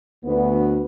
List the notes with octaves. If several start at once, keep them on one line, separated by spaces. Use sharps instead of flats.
D2 B3